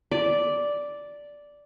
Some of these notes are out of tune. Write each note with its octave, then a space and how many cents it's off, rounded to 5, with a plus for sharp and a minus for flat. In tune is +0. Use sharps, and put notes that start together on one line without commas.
D5 -5